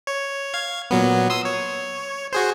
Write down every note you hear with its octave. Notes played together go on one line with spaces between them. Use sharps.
C#5
F5 G#6
A#2 F#3 B3
C6 D#6 E6
C#5
F#4 G#4 C5